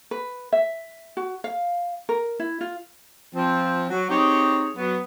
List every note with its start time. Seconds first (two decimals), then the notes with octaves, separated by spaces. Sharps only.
0.11 B4
0.53 E5
1.17 F#4
1.44 F5
2.09 A#4
2.39 E4
2.61 F4
3.35 F3 C4
3.89 F#3
4.10 C4 D#4 G4 G#4 C#5
4.77 F#3 B3